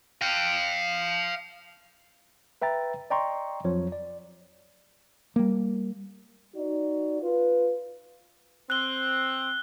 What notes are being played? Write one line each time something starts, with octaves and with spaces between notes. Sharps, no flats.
F5 G5
B4 E5 G5 A#5 A6
D5 D#5 G5 A#5 C6 C#6
F2 F3 F#3 C#5
D5
G3 A#3
D#4 F#4 D5
F4 B4
C4 F#6 G7